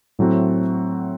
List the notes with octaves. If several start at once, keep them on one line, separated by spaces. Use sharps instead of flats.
A2 F#3 A3 C4 F#4